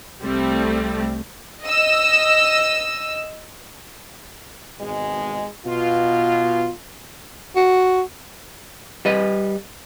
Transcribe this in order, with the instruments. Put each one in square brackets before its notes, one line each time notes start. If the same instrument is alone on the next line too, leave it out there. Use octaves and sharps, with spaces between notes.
[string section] C2 G3 A3 C4
D#5 E6
[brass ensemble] G#1 B2 G#3
B2 F4
[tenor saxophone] F#4
[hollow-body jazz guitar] G3 B4 D#5